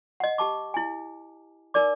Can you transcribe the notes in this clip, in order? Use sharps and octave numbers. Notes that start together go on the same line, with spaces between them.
D#5 F#5
G4 A5 D6
E4 G#5
D#4 A#4 D5 D6